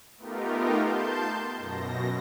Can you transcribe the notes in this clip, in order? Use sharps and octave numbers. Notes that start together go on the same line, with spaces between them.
A3 B3 D#4 F4 G4 A#4
A5 C6 G6
F#2 B2 A#6